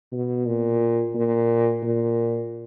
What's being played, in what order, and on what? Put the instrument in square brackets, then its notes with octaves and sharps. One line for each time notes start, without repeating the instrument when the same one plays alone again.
[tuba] B2
A#2
A#2
A#2